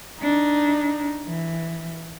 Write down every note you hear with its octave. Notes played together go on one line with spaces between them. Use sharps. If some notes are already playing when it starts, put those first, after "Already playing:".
D4 D#4
E3